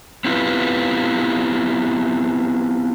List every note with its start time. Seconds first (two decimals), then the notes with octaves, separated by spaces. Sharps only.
0.25 B3 C4 E4 F4 G4 B4